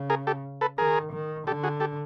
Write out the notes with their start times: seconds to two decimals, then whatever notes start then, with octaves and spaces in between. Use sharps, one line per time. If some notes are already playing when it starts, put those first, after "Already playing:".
Already playing: C#3
0.10 G#4 A#4
0.27 G4 A4
0.61 A4 B4
0.78 D#3 G#4 A#4
1.12 D#3
1.47 D3 G4 A4
1.63 F#4 G#4
1.80 G4 A4